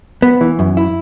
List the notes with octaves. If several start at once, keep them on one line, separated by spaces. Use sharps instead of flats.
B3
E3
F#2
E4